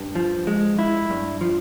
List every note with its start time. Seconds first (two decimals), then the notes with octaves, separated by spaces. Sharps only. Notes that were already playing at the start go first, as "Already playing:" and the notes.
Already playing: G2
0.15 F3
0.47 G#3
0.79 E4
1.10 G2
1.41 F3